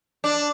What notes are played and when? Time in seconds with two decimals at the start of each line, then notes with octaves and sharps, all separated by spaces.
0.24 D4